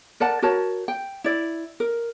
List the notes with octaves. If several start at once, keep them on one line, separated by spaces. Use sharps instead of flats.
A#4 D5 F#5 A5
F#4 A#4 C#5 A5
G5
E4 D5
A#4